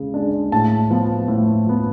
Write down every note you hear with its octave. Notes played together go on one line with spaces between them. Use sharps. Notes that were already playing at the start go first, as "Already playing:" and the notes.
Already playing: C#3 G#3
G#3 D4
A2 A5
F3 B3
A2
F3 B3